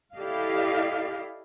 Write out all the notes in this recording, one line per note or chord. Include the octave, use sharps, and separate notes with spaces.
E4 G4 A4 D5 D#5 F5